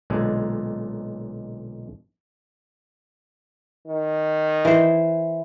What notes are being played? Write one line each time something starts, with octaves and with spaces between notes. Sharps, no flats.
B1 A#2 D3 G#3
D#3
E3 C5